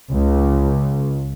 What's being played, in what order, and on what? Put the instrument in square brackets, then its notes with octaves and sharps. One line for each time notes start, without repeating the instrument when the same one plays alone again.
[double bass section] C#2